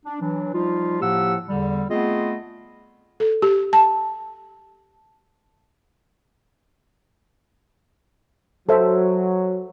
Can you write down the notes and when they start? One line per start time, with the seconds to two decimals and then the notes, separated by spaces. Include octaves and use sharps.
0.05 D4
0.21 E3 F#3 D4
0.54 F3 G3 D#4 F4
1.01 A2 F3 A#3 G4 F#5 E6
1.48 E2 D3 G3
1.89 A3 B3 C4 F4 G#4 D#5
3.20 A4
3.42 G4
3.73 A5
8.69 F#3 A4 C5 E5